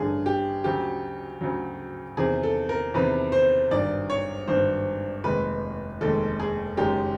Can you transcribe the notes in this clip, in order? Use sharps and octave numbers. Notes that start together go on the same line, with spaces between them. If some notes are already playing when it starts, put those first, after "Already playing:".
Already playing: A1 G2 D3 G#4
G4
D2 C#3 F#3 G4
D2 C#3 F#3
E2 C3 D#3 G#4
A4
A#4
E2 C3 D#3 B4
C5
G#1 G2 D#3 D5
C#5
G#1 G2 D#3 C5
F1 D#2 D#3 G#3 B4
F1 D#2 D#3 G#3 A4
G#4
F#1 F#2 D#3 G#3 G4